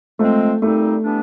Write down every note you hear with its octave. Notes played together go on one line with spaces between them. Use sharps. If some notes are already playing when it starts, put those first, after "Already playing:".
F3 G#3 A3 C4
A#2 G3 A3 C4 D#4
E3 G3 B3 D4